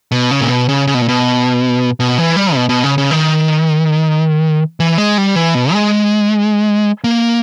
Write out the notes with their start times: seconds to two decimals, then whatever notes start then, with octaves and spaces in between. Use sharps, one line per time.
0.12 B2
0.31 C#3
0.41 A#2
0.49 B2
0.69 C#3
0.87 C#3
0.94 B2
1.02 A#2
1.08 B2
2.00 B2
2.18 E3
2.36 G3
2.55 B2
2.69 B2
2.84 C#3
2.98 C#3
3.11 D#3
4.80 E3
4.98 G#3
5.18 G3
5.35 E3
5.55 B2
5.73 G#3
7.04 A#3